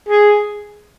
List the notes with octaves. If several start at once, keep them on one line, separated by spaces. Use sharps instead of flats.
G#4